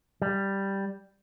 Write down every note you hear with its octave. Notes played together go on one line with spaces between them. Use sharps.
G3